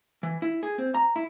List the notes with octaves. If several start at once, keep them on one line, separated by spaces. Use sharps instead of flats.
E3
E4
G#4
C4
A#5
E4